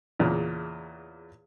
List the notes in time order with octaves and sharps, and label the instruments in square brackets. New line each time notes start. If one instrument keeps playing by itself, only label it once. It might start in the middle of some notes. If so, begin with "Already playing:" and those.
[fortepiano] E2 A#2 C#3